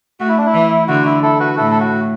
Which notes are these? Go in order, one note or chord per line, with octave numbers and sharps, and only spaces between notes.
A3 F#4
E4
D4
E4
E3
D3 F#4
E4
E4 A4
F#4 B4
A2 E4 A4
A4
F#4